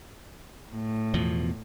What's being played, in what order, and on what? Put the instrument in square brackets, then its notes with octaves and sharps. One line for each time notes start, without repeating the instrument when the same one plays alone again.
[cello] A2
[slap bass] E2 B2 F3